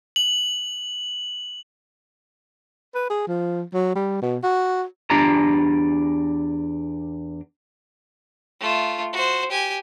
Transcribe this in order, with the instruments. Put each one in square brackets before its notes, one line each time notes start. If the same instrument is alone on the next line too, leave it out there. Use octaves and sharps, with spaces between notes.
[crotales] F#7
[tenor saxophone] B4
G#4
F3
F#3
G3
B2
F#4
[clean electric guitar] E2 D4 G4 D5 A#5
[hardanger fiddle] A3 F4
F#4 C5
G4 G#5